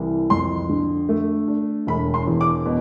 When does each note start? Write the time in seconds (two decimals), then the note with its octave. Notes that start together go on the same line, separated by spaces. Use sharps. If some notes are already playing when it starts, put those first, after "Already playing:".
Already playing: C2 E3
0.30 F2 C6
0.69 D3
1.09 A3
1.48 D4
1.87 E1 B5
2.14 C6
2.27 E2
2.41 D6
2.66 B2